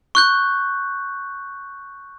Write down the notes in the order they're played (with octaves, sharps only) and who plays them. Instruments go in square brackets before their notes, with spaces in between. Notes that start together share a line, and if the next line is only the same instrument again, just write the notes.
[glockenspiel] C#6 F#6 G6